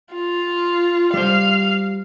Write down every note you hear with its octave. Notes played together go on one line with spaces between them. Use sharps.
F4
G3 C5 F5